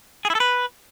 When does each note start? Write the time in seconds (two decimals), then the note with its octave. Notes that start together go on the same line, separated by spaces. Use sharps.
0.25 G#4
0.30 E4
0.35 A4
0.40 B4